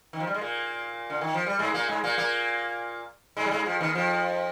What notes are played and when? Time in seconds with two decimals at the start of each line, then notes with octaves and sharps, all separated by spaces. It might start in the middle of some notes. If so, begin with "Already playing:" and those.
0.13 D#3
0.20 F3
0.27 G3
0.34 G#3
0.41 A#2 A#3
1.10 D3
1.21 D#3
1.34 F3
1.47 G3
1.59 G#2 G#3
1.74 A#2 A#3
1.89 G#2 G#3
2.04 A#2 A#3
2.18 A#2 A#3
3.36 G#2 G#3
3.46 G3
3.51 G#2 G#3
3.66 F2 F3
3.81 D#2 D#3
3.95 F2 F3